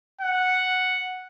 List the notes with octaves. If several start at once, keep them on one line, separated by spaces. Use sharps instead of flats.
F#5